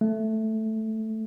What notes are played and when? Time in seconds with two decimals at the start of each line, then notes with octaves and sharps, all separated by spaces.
0.01 A3